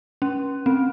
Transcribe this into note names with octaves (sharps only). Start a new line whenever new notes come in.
C#4
C4